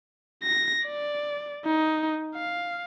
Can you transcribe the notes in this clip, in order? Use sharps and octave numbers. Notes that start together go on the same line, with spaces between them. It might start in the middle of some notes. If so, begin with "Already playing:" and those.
A#6
D5
D#4
F5